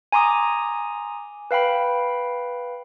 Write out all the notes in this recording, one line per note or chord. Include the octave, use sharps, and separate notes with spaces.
G#5 A#5 C6 D6 D#6
B4 F5 G5 B5